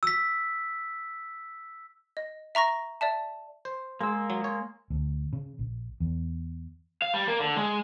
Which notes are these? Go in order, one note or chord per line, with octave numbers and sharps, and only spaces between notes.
E6 B6
D#5
E5 A#5 C#6 A#6
D5 E5 A5
C5
G#3 A#3 E6
F#3
C#5
D2
C#3
A#1
E2
F5
G3
A#3
D3
G#3